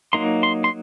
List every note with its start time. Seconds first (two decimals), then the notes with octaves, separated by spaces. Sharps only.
0.13 F#3 A#3 D#4 C6
0.43 C6
0.64 C6